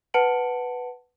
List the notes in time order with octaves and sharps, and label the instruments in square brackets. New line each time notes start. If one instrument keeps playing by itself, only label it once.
[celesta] B4 F#5 A5 C#7 D7 F#7